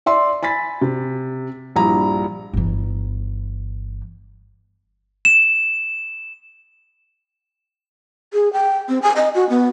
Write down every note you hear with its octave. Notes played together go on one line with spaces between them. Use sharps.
D5 E5 C6
G#5 B5 A6 B6
C3
A#1 G2 E4 A#5
G1 E3
E7
G#4
G5
C4
G#5
D#5
F#4
B3